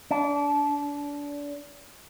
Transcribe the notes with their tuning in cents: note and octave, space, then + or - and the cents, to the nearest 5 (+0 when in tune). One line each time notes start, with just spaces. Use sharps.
D4 -25